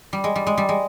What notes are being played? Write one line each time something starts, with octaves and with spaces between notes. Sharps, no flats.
G3
G#3
G3
G#3
G3
G#3